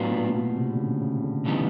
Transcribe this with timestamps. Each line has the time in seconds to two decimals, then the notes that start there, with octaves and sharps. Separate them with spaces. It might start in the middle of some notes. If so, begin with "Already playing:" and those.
Already playing: A2 F#3 B3 D4 F4
0.11 A#2
0.29 A#2
0.34 B2
0.56 C3
0.72 D3
0.78 C#3
1.01 C#3
1.23 D3
1.45 C#3 E3 G3 B3 D#4